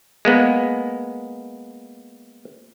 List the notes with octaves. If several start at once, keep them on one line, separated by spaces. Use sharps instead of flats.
G#3 A#3 B3